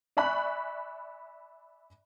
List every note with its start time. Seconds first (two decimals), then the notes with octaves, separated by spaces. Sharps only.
0.17 D5 E5 G#5 B5 C#6 F#6